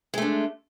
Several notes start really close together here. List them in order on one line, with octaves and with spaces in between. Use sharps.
G#3 A3 D4